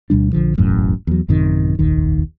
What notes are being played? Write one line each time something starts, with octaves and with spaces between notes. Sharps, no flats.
D2 B2 G3 D4
A#1 D3 F3
E1 A1 F#2 A2
E2 F#3
A1 F#2 C3 D#3
F1 A#1 D#2 D#3